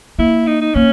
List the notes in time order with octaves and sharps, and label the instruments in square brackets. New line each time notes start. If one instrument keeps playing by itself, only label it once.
[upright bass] A#3 [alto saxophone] E4
[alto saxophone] D#4
D#4
[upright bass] A#3 [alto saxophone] C#4